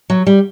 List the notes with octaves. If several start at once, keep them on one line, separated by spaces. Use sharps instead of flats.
F#3
G3